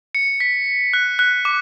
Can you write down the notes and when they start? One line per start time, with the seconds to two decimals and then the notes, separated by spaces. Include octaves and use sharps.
0.15 C#7
0.40 B6
0.94 F#6
1.19 F#6
1.45 D6